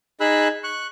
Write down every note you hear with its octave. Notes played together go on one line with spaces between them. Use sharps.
D#4 G#4 B5 E6 F#6
C#6 F#6